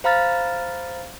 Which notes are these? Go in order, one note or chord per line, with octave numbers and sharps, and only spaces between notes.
C5 F5 A#5 B5 F6 A6